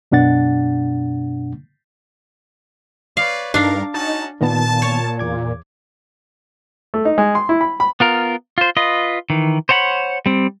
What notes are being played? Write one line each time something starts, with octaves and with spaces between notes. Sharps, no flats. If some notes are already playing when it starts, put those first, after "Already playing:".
F#2 B2 D4 F#5 A6
B4 C#5 D5 F5
G2 D4 D#4 A4 A#4 F5
C#4 D#4 F#4 A5 A6
A#2 D#3 B3 A5
C#5
E2 D6 G#6
A3
D#4
G#3
C6
E4
B5
B5
B3 F4 A#4
F4 C5
F4 B4 D#5
D#3 E3
C5 C#5 F#5 A5 B5
G3 C4